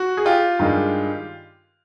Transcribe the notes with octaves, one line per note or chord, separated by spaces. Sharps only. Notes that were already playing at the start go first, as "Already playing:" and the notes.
Already playing: F#4
G#4
F4 G4
G2 D#3 G#3